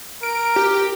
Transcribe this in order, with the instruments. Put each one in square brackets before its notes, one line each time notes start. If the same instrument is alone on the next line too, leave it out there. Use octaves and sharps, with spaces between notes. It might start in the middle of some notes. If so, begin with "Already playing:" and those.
[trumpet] A#4 [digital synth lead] D7
[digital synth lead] G4